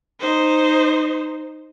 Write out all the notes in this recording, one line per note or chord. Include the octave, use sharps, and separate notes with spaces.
D#4 C5